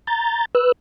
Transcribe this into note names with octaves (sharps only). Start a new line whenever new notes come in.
A#5 G6 A6
B4 E6 F#6